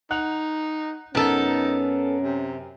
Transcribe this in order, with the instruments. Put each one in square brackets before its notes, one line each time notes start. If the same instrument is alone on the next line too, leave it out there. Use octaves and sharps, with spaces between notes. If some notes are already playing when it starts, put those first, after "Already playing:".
[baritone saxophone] D#4 [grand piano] F#5 F#6 F7
[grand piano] F#2 A#4 [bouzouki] B3 A4 [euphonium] C#4 [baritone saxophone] D#4
[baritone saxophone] C3